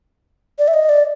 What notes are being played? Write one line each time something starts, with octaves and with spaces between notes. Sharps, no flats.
D5
E5
D#5
D5